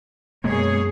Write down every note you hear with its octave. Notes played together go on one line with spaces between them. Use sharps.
F#2 B2 G#3 A#3 G#4 C#5